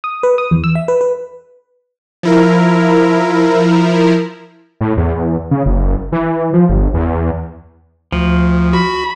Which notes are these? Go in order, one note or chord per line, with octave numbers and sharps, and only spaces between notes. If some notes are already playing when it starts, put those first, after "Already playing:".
D#6
B4
D#6
E2
E6
E5
B4
B4
F3 E4 A#4
A2
E2
C#3
F#1
E3
F3
G1
E2
D2 F3
F#4 B5